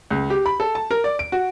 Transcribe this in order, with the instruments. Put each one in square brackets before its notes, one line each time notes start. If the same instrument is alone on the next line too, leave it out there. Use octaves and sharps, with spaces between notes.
[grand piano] C#2
G4
B5
A4
A5
A#4
D5
D7
F#4